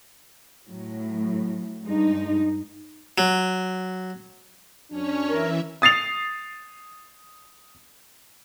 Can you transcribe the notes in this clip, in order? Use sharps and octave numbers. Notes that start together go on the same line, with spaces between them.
A2 F#3
G2 G#3 D#4
F#3
F#2 C#4 D4 C#5
E3 A#4 E5
D#6 A6 C7 F7